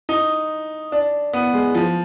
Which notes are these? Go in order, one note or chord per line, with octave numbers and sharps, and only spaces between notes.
D#4
D4
B3
G#3
F3